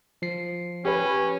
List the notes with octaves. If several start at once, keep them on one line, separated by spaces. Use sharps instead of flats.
F3 C7
C#4 G4 B4